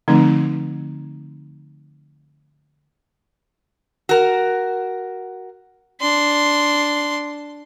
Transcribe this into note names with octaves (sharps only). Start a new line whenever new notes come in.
D3 F3 A3 C4 D#4
F#4 A#4
D4 C6